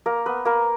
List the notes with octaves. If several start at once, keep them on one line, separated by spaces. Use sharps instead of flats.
A#3 A#4
B3 B4
A#3 A#4